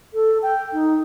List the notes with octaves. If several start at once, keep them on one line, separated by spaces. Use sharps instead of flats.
A4
G5
D#4